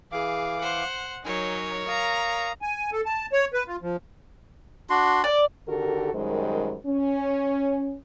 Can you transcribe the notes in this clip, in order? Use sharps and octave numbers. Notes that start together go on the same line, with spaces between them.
E3 G#4 F5 D6
C5 F#5
F#3 D#4 A#4 C#5 G#5
F5 A#5 D#6
G#5
A4
A5
C#5
B4
F4
F3
D4 F#4 C6
D5 D6
D3 D#3 F#4 G4 A4 A#4
F#2 D#3 G3 G#3 A#4 C5
C#4